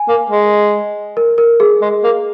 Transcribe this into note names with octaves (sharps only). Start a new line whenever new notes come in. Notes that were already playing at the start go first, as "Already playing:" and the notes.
Already playing: G#5
A#3
G#3
A#4
A#4
G#4
G#3
A#3